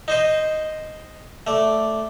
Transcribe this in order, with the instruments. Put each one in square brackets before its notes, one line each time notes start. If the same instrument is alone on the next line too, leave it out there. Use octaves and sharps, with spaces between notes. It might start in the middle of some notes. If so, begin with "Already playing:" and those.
[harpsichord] D#4 C5 D#5
A3 D5